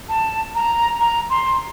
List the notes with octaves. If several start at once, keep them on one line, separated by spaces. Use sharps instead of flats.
A5
A#5
A#5
C6